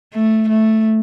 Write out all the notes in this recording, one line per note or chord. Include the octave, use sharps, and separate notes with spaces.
A3
A3